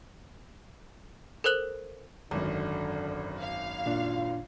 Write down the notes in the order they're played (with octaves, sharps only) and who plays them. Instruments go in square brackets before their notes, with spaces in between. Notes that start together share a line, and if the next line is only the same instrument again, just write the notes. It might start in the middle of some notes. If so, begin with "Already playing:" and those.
[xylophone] A4 A#4 C5 F#6 F#7
[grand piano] G#1 F#2 [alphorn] D3
[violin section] F5
[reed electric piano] A#2 D4 [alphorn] F4